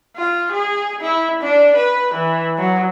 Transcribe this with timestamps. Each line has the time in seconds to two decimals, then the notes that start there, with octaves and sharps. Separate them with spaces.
0.16 F4
0.52 G#4
1.01 E4
1.41 D4
1.76 B4
2.14 E3
2.58 F#3